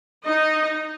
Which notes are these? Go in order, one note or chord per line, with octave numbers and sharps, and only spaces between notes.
D#4 D#5